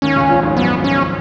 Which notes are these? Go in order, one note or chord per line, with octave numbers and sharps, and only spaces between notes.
D#2 D#3 C#4
C#2 C#3
A#1 A#2
G#1 G#2
F#2 B3
C#4